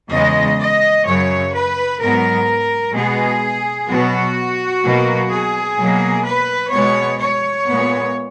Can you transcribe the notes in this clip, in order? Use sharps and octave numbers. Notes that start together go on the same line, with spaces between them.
E2 C#3 G#3 D#5
D#5
F#2 C#3 F#3 C#5
B4
G#2 F#3 B3 A#4
B2 G#3 B3 G#4
B2 F#3 B3 F#4
B2 F#3 A#3
G#4
B2 F#3 A#3
B4
B2 G#3 B3 C#5
C#5
A#2 G#3 B3